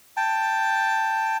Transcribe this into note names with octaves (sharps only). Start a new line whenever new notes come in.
G5 A5